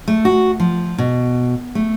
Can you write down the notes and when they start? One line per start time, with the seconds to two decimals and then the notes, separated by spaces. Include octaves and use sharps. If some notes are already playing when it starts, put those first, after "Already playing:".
0.08 A3
0.25 F#4
0.60 F3
0.98 B2
1.75 A3